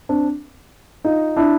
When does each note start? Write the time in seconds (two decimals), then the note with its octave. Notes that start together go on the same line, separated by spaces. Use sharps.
0.09 C4 D4
1.04 D#4 F4
1.37 D4 E4